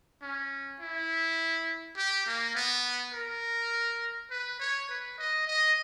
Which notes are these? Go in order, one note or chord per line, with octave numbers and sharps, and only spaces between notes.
C#4
E4
G4
A#3
B3
A#4
B4
C#5
B4
D#5
D#5